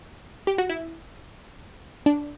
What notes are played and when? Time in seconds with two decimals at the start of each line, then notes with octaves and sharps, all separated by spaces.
0.47 G4
0.58 F#4
0.69 E4
2.06 D4